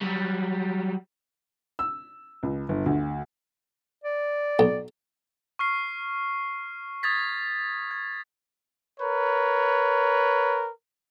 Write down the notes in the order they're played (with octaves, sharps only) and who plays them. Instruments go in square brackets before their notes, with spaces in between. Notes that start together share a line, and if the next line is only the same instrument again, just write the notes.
[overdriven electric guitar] F#3 G3
[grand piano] E6
C#2
G1
D2
[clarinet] D5
[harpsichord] B1
[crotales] C#6 F6 C7
D#6 G#6 A6 B6
G#6
[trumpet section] A#4 B4 C#5